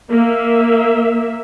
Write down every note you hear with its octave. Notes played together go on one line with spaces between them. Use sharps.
A#3 E5